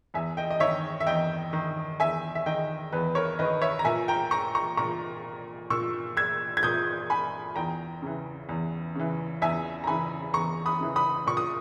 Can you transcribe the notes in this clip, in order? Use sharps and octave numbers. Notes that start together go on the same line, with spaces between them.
E2 E5 G#5
D#5 G5
D#5
D#3 C#5 E5
E5
E2 D#5 G5
D#3
E2 E5 G#5
E5
D#3 D#5 G5
E2 B4
A#4 C#5
D#3 B4 D#5
C#5 E5
A#5
A#2 E5 G#5
G5 A#5
A#5 C#6
A#5 C#6
A#2 A#5 C#6
A#2 C#6 E6
E6 G#6
G#6
A#2 D#6 G6
G#5 B5
E2 G5 A#5
C#3 E3
E2
C#3 E3
E2 E5 G#5
A#5
C#3 E3 G#5 B5
E2 A#5 C#6
B5 D#6
C#3 E3
B5 D#6
A#2 C#6
D#6